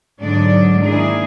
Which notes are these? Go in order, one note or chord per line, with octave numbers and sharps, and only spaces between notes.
G#2 D3 F#3 D4 D#4 D5
D#3 A#3 D4 E4 G#4